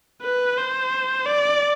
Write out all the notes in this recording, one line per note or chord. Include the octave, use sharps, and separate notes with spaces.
B4
C5
D5